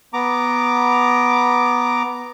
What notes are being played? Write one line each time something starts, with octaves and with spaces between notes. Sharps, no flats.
B3 A#5 D6